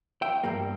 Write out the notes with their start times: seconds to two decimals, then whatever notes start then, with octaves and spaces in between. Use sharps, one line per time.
0.22 E5 G5
0.43 G2 G3 A#3